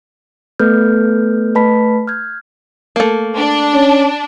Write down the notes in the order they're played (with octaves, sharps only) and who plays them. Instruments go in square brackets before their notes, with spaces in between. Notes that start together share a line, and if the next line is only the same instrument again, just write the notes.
[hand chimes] A3 B3 A4 B4 F6 G6
A3 B4 A5 B5 B6
F6 G6 G#6
[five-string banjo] A3 A#3
[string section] D4
[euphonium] C#4